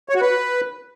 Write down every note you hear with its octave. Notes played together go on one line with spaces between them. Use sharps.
C#5
F#4
B4